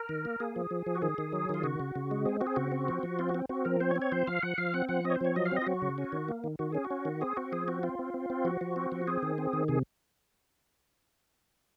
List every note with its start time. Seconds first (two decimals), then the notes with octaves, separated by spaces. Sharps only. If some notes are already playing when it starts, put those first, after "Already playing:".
Already playing: A#4
0.09 D#3
0.25 A#3
0.40 A#3 G#4
0.56 F3
0.71 F3
0.86 F3
0.95 F#4
1.02 D#3 G#4
1.18 D#3
1.33 F#3
1.49 D#3 F4
1.64 C#3 F#4
1.80 C#3
1.95 C#3
2.11 G#3
2.25 C4 G#4
2.41 C4 F#4
2.47 G#4
2.56 C#3 F#4
2.72 C4
2.88 F3
3.03 F3
3.19 C4 F4
3.29 F#4
3.35 C4
3.49 C4 F#4
3.65 F3 A#4
3.80 C4 C5
3.91 C#5
3.96 C4
4.02 C#5
4.12 F3 C5
4.27 F3 F5
4.42 F3 F#5
4.58 F3 F5
4.74 C4 F#5
4.89 F3 F#5
5.04 C4 D#5
5.10 C#5
5.15 C5
5.21 F3 C#5
5.36 F#3 D#5
5.45 F5
5.51 C4
5.56 D#5
5.62 F4
5.67 F#3 F#4
5.82 C#3
5.98 C#4
6.12 D#3
6.29 A#3
6.44 D#3
6.59 D#3 F#4
6.72 C#4 G#4
6.85 F#4
6.91 C#4
7.05 D#3
7.21 C4 G#4
7.37 C4 F#4
7.52 F3 G#4
7.68 C4 F#4
7.83 C4 F4
7.99 C4
8.14 C4
8.30 C4
8.45 F3 F#4
8.61 F3
8.76 C4
8.92 F3
9.07 C4 G#4
9.23 D#3
9.38 C4
9.53 D#3
9.68 C3 G#4